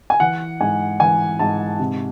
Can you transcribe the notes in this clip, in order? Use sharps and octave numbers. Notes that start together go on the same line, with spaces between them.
G#5
E3 F#5
G#2 G#5
E3 G#5
G#2 A5
C3